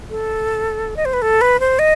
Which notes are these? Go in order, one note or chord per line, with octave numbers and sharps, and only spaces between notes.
A4
D#5
C5
B4
A4
B4
C5
D#5